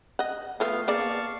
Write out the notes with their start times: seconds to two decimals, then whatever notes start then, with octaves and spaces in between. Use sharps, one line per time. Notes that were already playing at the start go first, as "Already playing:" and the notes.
0.19 D#5 F#5
0.60 F3 A3 B3 F4 F5
0.88 A#3 G#4 D5 F5 A5 C#6